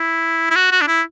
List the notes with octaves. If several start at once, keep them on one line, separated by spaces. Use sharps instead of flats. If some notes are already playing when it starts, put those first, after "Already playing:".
Already playing: E4
E4
F#4
F#4
D4
E4